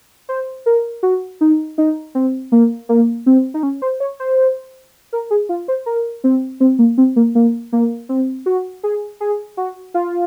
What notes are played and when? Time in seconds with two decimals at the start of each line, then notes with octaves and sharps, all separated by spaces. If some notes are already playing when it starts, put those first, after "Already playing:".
0.29 C5
0.66 A#4
1.03 F#4
1.41 D#4
1.78 D#4
2.15 C4
2.52 A#3
2.89 A#3
3.26 C4
3.54 D#4
3.63 C#4
3.82 C5
4.00 C#5
4.20 C5
5.13 A#4
5.31 G#4
5.49 F4
5.68 C5
5.86 A#4
6.24 C4
6.60 C4
6.79 A#3
6.98 C4
7.16 A#3
7.35 A#3
7.72 A#3
8.09 C4
8.46 F#4
8.83 G#4
9.20 G#4
9.57 F#4
9.94 F4